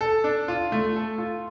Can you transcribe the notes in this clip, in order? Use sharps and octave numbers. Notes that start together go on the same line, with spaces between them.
A4
D4
F4
A3
A4
F4